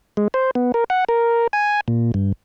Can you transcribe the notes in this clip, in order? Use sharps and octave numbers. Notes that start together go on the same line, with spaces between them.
G#3
C5
B3
A#4
F#5
A#4
G#5
A#2
G2